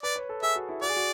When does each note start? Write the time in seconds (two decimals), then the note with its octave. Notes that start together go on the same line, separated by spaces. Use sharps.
0.03 B4 D5
0.16 C#5
0.29 A4
0.42 G#4 E5
0.56 F#4
0.69 E4
0.81 F#4 D5
0.89 G#4
0.97 F#4